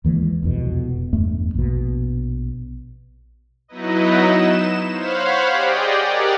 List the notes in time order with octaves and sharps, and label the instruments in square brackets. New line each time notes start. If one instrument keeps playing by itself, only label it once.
[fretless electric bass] D#2 E3 F3 G#3
E1 C2 F2 B2
E2 G2 A3
A#1 B2
[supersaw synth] F#3 B3 D#4 E4 B4 D#5
E7
C5 C#5 F5 F#5 B5
G4 G#4 D5 D#5 G5
G4 A#4 D5 F#5